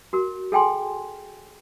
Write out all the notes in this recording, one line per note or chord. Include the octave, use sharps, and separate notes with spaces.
F#4 A#4
G#4 A4 G5 G#5 C6